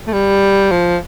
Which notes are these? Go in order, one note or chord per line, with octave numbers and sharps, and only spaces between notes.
A3
G3
F3